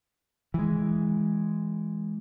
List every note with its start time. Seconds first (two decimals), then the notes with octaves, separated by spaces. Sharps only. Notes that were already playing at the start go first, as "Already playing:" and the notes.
0.54 E3 G#3